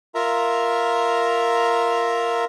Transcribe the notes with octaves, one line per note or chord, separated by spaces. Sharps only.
F4 A#4 E5 A#5